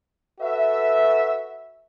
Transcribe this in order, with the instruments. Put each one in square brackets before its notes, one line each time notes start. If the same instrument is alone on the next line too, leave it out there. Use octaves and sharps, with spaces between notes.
[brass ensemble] F#4 A4 B4 E5